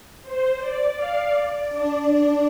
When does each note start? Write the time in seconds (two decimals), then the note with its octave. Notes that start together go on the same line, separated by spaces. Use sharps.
0.22 C5
0.59 D5
0.96 F5
1.32 D5
1.69 D4